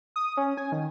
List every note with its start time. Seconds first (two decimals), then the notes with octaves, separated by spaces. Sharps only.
0.16 D#6
0.37 C#4
0.57 G#5
0.72 D#3